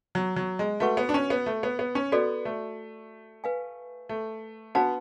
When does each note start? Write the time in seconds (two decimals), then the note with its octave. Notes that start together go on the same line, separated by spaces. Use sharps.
0.15 F#3
0.36 F#3
0.59 G#3
0.80 A3 F#4 B4 F#5 C#6
0.97 B3
1.09 D4
1.14 C#4
1.30 B3
1.46 A3
1.63 B3
1.79 B3
1.95 C#4
2.12 B3 F#4 A4 D5
2.45 A3
3.44 B4 F5 G#5
4.09 A3
4.75 B3 D4 F#4 B4 F#5 A5